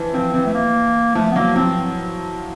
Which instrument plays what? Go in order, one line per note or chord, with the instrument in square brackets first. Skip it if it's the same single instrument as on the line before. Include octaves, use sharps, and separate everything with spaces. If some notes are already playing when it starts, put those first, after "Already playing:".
Already playing: [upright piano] E3 F3
[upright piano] F3 [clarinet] C4
[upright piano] E3 [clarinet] C4
[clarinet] A3
A#3
[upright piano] F3 [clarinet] A3
[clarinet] B3
[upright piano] F#3 [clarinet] A#3
[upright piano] F3 [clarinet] C4